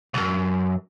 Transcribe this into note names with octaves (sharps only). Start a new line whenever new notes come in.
C2 F#2